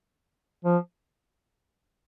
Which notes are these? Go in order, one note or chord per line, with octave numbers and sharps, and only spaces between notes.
F3